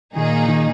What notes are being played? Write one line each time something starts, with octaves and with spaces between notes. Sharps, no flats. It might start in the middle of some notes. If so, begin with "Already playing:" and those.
A#2 D#3 A#3 D#4 G#4
D#3